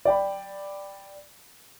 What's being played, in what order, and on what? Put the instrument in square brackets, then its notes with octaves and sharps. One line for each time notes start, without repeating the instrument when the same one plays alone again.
[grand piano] D5 G5 B5